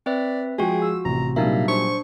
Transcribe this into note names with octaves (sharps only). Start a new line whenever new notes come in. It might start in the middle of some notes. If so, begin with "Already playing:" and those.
C4 B4 D5 E5
F3 G#3 F4 F#4 G#4 G5
E6
A1 C3 A#5
A#2 F#3 G3 A#3 D4 D#4 E5
D4 C5 C#6